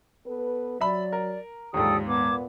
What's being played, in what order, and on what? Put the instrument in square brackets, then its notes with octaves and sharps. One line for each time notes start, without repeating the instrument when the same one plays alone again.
[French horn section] B3 A4 B4
[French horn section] F#3 [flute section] D5 [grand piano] E5 B5
[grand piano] A#4
[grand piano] D#2 G#2 [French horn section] D3 F3 G3 [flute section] A4 G5 D#6
[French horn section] A#2 B3 [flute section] A5 D6 G#6